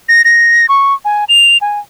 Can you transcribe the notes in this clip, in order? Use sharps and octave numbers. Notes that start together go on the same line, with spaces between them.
A#6
A#6
C#6
G#5
F7
G#5